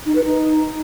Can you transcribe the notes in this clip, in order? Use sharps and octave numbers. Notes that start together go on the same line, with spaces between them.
D#4
B4
D#4